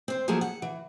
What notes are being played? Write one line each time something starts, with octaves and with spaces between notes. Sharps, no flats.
C4 C5
F3 F#3 A#3 E4 G#4 A4
F#5
E3